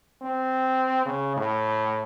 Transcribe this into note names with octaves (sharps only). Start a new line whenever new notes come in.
C4
C#3
A2